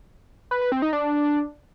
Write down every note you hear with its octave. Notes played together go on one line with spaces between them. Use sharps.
B4
B4
C4
D#4
D4